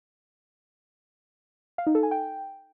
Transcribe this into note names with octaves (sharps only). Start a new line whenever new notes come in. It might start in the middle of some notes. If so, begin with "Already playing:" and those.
F5
D#4
A4
G#5
G5